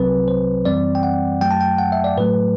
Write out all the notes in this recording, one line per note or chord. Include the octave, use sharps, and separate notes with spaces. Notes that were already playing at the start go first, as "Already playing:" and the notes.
Already playing: C2 C3 F#3 C4 B4
C5
F#2 E3 G3 C4 D5
G5
F#5
F#2 F#3 A3 G5
A5
G5
F#5
E5
D5
A2 F#3 A3 B4